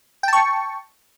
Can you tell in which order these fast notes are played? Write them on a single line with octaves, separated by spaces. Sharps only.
G5 A5 C#6